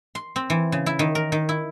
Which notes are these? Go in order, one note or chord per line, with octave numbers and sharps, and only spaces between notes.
C6
C4
E3
C#3
E4
D#3
A#4
D#3
E4